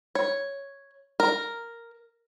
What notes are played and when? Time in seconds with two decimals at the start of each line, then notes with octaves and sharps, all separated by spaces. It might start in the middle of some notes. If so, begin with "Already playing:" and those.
0.15 C#5
1.20 A#4